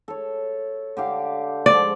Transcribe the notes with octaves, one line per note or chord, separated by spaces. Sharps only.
A4 C#5
D3 G4 F5
G#2 F3 D5 C6